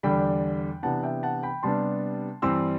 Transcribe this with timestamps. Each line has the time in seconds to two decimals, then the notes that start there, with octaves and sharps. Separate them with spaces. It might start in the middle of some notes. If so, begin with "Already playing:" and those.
0.03 E2 D3 G3 D4 G5 B5
0.83 C3 E3 B3 D4 F#5 A5
1.03 E5 G5
1.23 F#5 A5
1.43 G5 B5
1.63 C3 G3 B3 D4 A5 C6
2.42 G2 E3 G3 C4 C6 E6